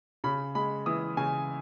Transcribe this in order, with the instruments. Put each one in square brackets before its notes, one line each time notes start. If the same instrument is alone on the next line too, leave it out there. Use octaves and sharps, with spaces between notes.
[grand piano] C#3 B5
G#3 B5
E3 D#6
C#3 G#5